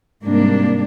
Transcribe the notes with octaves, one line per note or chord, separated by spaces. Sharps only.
G#2 C3 G3 A#3 D4